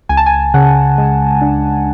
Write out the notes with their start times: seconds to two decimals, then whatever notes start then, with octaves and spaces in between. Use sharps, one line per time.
0.09 C#2 G#5
0.17 A5
0.26 G#5
0.54 C#3 F#5
0.98 G#3
1.41 D4